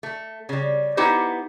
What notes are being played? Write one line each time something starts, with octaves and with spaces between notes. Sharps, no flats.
A3
C#3 G3
B3 D#4 E4 G4 C5